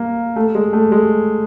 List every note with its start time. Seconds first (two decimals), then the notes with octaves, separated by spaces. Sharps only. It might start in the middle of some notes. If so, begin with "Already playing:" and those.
Already playing: A#3
0.36 A3
0.55 G#3
0.73 A3
0.92 G#3